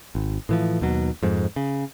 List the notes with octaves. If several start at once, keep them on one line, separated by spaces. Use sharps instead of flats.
G#1
A2 E3 F3
D#2 B2 F#3
F2 G#2
C#3